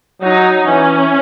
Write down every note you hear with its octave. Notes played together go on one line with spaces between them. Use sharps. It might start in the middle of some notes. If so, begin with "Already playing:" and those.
F#3 D#4
E3 C#4